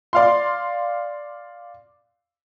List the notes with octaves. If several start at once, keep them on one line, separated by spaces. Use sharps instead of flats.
D5 F5 C6